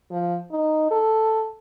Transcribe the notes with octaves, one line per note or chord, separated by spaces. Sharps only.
F3
D#4
A4